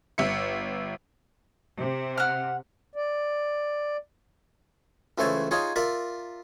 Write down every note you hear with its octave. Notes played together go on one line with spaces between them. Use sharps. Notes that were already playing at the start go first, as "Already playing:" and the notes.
G1 E5 C#7
C3
F#5 F6
D5
C#2 E3 A3 C5 C#5 A5
D#4 F4 G#4 C#5
F4 A#4 D5 E5